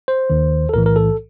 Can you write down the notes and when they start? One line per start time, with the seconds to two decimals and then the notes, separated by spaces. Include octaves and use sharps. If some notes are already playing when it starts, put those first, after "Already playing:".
0.08 C5
0.30 D#2 D#3
0.69 A4
0.74 B1 A2 E3 A#4
0.86 A#4
0.96 A4